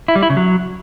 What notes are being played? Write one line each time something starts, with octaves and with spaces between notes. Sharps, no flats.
E4
G3
E4
C#3
F#3